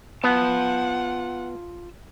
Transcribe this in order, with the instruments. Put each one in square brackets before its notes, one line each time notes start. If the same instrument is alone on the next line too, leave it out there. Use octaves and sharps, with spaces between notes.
[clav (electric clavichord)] B3 [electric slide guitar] F4 A5 [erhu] F#5